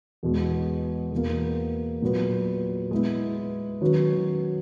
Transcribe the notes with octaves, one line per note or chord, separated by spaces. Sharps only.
E2 B2 G#3
E2 B2 A#3
A#2 F#3 B3
G#3 B3 E4
D#3 F#3 C#4 F#4 B4